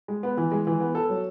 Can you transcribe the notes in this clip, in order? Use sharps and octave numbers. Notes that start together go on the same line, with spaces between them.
G#3
B3
E3
G#3
E3
B3
A4
F#3